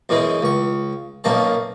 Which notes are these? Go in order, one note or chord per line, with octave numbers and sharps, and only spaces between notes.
F#2 B2 E3 G#3
C#2 C#6
B1 F#2 B2 A#3 A5